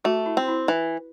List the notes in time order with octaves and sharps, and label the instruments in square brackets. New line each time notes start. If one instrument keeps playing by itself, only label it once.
[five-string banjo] A3 [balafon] F#4
[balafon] E4
[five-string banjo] C4
[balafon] E4
[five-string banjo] E3